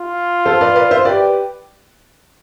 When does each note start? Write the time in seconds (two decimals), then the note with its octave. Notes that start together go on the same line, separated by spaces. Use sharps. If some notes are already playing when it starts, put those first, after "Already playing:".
Already playing: F4
0.45 A4 C5
0.61 B4 D5
0.76 B4 D5
0.91 C5 E5
1.05 G4 B4 D5